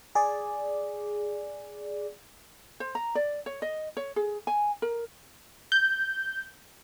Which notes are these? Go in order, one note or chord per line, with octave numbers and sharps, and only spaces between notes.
G#4 D5
C5
A#5
D5
C#5
D#5
C#5
G#4
G#5
A#4
G6